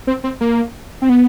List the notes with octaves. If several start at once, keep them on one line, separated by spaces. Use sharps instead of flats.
C4
C4
A#3
C4
B3